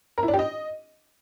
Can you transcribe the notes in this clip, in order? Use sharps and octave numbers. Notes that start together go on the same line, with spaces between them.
A#4
E4
D4
G4
D#5